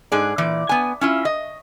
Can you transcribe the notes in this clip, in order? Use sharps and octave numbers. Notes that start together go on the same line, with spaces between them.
G#2 G#4 D5
A#2 E3 D5
B3 G#5
C#4 E4 F4
D#5